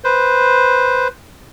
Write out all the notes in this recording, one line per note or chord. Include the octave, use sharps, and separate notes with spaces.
B4 C5